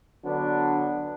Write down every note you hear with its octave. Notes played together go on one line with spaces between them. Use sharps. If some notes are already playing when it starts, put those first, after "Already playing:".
D3 F#3 B3 D4